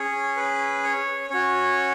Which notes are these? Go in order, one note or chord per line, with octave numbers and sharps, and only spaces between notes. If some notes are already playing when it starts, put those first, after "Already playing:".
Already playing: C#4 G#4 C#5
B4
C#5
C#4 F#4 C#5